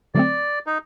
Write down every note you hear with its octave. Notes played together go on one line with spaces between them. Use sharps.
D3 F#3 A3 C4 D5
D#4